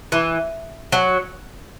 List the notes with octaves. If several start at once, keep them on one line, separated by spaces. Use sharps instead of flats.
E3
F#3